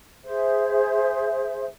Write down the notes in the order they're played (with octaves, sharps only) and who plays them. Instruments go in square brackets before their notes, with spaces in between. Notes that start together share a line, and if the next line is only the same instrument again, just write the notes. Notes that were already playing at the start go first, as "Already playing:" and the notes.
[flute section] G#4 C5 E5